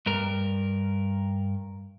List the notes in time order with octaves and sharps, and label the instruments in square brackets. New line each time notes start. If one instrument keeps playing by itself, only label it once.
[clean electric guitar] G2 A#4